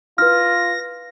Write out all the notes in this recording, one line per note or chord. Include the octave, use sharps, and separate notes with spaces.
E4 F4 B4 F6 A#6